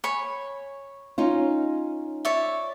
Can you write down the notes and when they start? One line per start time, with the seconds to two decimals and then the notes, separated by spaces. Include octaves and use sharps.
0.04 C#5 G#5 B5
1.18 C#4 D#4 F4
2.25 C#5 D5 E5